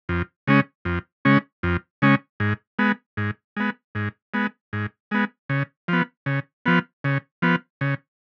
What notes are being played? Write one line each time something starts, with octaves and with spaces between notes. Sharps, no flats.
F2
C#3 G#3 C#4
F2
C#3 G#3 C#4
F2
C#3 G#3 C#4
G#2
G#3 B3
G#2
G#3 B3
G#2
G#3 B3
G#2
G#3 B3
C#3
F3 B3
C#3
F3 B3
C#3
F3 B3
C#3